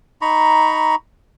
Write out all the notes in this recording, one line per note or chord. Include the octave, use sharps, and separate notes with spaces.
D#4 A#5 B5 C#6